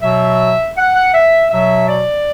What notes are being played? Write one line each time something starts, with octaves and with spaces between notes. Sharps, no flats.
B2 F#3 E5
F#5
F#5
E5
B2 F#3 E5
D5